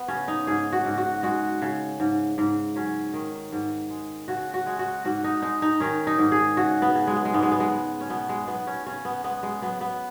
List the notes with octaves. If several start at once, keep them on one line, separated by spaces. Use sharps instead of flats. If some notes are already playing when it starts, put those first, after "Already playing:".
Already playing: B3
C#3 C#4
D#4
G#2 G#4
F#4
G#2
F#4
G#3 F#4
C#3
G#2
G#2
F#3 C#4
D#3
G#2
G#3
C#3 F#4
F#4
G#3
F#4
G#2 F#4
D#4
G#3 D#4
D#4
D#3 C#4
D#4
G#2
G#4
C#3 F#4
B3
C#3
G#3
B3
G#3
G#2 B3
G#3
B3
G#3
G#3
C#4
B2 B3
G#3
F#3 B3
C#4
C#3 C#4
B3
G#3 B3
G#3
F#3 B3
B3